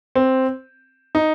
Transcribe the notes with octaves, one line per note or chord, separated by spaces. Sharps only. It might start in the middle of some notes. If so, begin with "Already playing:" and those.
C4
D#4